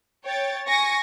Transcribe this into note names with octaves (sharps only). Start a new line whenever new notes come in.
C#5 G5 A6
G#5 C#6 A#6